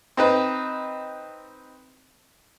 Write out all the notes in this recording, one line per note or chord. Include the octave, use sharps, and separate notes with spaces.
C4 D#4 B4